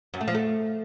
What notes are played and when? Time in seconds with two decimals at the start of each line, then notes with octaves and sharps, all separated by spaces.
0.14 F#2
0.21 A3
0.28 F3
0.35 A3